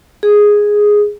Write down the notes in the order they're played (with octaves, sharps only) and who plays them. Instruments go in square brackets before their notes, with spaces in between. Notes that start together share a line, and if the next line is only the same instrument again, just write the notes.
[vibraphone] G#4